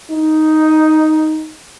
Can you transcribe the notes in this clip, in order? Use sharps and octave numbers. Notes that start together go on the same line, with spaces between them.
D#4